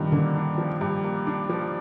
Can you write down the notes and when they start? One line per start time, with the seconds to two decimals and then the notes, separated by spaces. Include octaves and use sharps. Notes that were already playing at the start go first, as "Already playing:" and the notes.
Already playing: G2 D#3 F3 A#3 D4
0.12 D3 A#3
0.35 D4
0.58 F3
0.81 G2
1.04 A#3
1.27 D4
1.49 F3